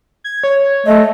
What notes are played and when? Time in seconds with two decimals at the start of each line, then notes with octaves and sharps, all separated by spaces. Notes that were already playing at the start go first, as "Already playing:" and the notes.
0.24 G#6
0.44 C#5
0.86 A3 D#5